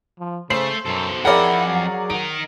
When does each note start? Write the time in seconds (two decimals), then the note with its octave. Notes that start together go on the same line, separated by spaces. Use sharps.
0.20 F3
0.50 C#3 A3 A4 C5 C7 F#7
0.85 F#2 B2 A4
1.25 F2 E4 G#4 A#4 D5 F#5 G5
1.67 F#3
2.10 D#4 A#4 D7